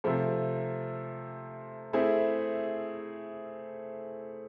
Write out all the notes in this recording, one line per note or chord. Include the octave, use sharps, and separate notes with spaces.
C3 F3 A3
A3 C4 E4 G#4